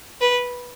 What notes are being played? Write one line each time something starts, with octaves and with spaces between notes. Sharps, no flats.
B4